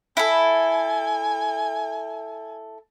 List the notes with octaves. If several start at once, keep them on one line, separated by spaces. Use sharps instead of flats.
E4 A4 G#5